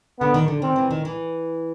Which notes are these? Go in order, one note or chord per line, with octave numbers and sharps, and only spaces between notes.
D3 B3
D#3
D3
D#3 C4
E3
D#3
E3